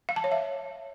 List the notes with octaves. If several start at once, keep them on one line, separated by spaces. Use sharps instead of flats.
F5
A5
C#5
E5